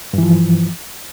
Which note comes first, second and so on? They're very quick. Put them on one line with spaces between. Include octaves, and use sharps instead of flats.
G2 E3 F3